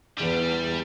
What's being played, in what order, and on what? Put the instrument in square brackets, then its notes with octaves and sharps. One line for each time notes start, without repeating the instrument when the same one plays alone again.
[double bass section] E2 [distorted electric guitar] G3